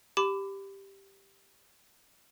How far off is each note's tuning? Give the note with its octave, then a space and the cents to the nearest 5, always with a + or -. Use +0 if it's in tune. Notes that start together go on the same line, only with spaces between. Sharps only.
G4 +0 B5 +30 D6 +0